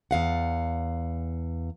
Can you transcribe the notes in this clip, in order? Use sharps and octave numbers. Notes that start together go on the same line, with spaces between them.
E2 F5 F#5